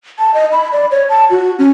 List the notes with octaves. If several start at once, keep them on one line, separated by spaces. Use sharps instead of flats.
A5
D#5
B5
D5
C#5
A5
F#4
C#4